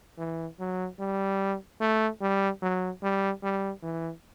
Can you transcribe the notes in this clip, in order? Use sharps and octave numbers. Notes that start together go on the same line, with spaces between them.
E3
F#3
G3
A3
G3
F#3
G3
G3
E3